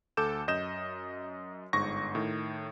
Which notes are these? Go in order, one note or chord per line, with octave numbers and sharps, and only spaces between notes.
D2 A4 D6 G6 E7
F#2 D#5 G6 E7
G1 G#2 C#6 A#6
A2 D#3